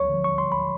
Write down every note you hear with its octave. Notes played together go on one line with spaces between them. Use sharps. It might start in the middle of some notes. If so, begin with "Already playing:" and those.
Already playing: D2 C#5 C#6
D3 F3
C#6
C6
B5